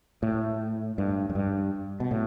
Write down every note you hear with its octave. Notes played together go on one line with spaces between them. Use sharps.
A2
G2
F#2
G2
B2
A2